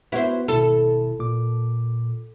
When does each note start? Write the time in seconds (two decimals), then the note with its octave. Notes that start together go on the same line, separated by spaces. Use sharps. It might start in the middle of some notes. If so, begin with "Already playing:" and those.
0.12 B3 E4 F#4 B4 C5
0.48 G#1 B2 E4 A4
1.19 A#2 D6